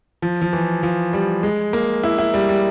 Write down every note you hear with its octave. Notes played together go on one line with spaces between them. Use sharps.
F3
F3
E3
F3
G3
G#3
A#3
E4
E4
G3
G3